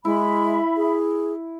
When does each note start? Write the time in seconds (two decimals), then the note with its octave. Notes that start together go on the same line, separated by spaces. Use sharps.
0.05 G#3 E4 E5 B5
0.76 G#4